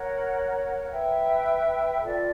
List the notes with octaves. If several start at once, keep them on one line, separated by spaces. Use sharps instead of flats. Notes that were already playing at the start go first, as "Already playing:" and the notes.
Already playing: A#4 C#5 F#5
B4 E5 G5
F4 A4 D5